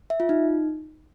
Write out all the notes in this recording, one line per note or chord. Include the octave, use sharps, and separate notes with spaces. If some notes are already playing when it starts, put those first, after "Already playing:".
E5
F4
D#4